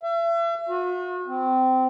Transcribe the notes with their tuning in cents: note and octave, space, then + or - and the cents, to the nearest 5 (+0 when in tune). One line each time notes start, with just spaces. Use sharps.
E5 +40
F#4 -45
C4 -20